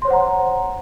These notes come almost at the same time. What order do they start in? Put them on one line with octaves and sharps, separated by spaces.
C6 C#5 C5 F#5 A#5